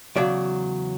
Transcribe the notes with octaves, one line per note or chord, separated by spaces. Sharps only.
E2 C#3 F#3 D5